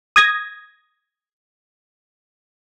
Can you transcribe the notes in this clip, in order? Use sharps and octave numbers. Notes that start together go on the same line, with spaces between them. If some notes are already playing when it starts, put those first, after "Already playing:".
D#6 G#6 A#6